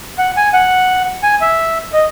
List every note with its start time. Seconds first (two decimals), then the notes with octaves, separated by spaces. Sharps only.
0.18 F#5
0.37 G#5
0.53 F#5
1.23 G#5
1.41 E5
1.93 D#5